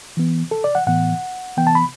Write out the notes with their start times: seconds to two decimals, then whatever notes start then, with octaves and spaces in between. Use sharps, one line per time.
0.17 E3 B3
0.51 A4
0.64 D5
0.75 F#5
0.87 A2 E3 B3 F#5
1.57 E3 B3 G5
1.67 A5
1.75 B5